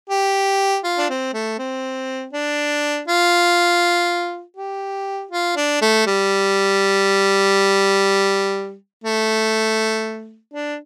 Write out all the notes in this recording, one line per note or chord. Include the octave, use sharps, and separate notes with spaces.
G4
F4
D4
C4
A3
C4
D4
F4
G4
F4
D4
A3
G3
A3
D4